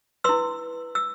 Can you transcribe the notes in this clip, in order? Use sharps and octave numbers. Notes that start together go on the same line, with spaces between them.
E4 B4 C6 E6
E6